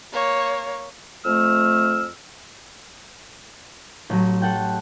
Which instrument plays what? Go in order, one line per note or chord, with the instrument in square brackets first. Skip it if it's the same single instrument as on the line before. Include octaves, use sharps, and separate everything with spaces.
[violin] A#3 C#5
[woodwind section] F2 A3 E6 F6
[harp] A1 F#3
A4 F#5 G5